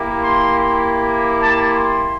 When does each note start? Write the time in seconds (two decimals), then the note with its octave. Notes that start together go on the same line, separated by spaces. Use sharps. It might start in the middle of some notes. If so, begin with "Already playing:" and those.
Already playing: A#3 E4 G4
0.22 C6
1.41 A5
1.70 C6